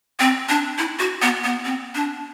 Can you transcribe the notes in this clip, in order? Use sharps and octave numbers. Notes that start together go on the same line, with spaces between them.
C4
D4
E4
F#4
B3
B3
C4
D4